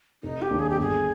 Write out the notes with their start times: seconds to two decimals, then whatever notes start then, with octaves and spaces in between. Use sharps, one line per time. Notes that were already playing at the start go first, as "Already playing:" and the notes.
0.23 F1 D#4
0.42 G4
0.51 D#2 D#3 A#3 D4
0.59 G#4
0.69 G4
0.77 G1 G#4